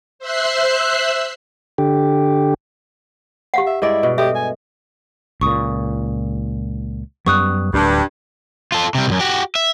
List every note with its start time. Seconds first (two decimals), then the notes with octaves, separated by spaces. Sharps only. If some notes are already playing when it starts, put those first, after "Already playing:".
0.19 C5 E5 E6 F#6 C7
1.78 D3 G4
3.54 G4 F5 F#5
3.67 E5
3.82 G2 G#3 E4 D5
4.03 B2
4.18 G4 A4 E5
4.35 G#5
5.41 C#2 A#2 C#6 D#6
7.26 F#2 G3 B3 C#6 D#6 F#6
7.74 D1 D2 G2 G3
8.72 F4 A4
8.95 C3 G3
9.08 C2 F#2
9.20 F#4 G4
9.55 E5